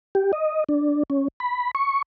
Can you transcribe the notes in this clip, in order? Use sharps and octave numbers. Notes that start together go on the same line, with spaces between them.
G4
D#5
D4
C#4
B5
C#6